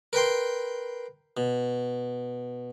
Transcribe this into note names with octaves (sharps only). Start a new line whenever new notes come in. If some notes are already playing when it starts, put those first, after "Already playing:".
A#4 B4 G5 C6
B2